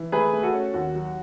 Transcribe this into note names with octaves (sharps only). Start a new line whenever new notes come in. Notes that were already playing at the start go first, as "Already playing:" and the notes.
Already playing: E3
A3 G#4 B4
A3
F#4 A4
C#4
D#2 F#4
F#3